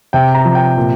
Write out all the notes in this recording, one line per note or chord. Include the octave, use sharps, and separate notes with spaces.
C3 G5
A#5
F3
G5
A#2